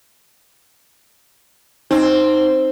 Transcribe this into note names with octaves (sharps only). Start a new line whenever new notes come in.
C4 D#4